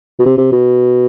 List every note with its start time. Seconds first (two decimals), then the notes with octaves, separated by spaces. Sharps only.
0.19 B2
0.26 C3
0.38 C3
0.52 B2